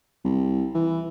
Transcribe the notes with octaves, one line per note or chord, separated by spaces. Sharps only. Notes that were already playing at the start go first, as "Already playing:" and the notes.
C2
E3